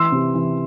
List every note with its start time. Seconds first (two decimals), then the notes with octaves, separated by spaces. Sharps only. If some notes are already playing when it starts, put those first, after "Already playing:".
Already playing: E3 C6 E6
0.12 C3
0.35 E3